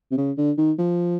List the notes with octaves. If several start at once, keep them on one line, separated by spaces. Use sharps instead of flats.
C3
C#3
D3
D#3
F3